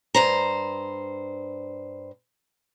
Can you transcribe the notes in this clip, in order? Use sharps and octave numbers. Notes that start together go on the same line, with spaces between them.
G2 C5 A#5